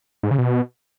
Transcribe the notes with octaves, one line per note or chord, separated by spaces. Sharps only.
G#2
C#3
B2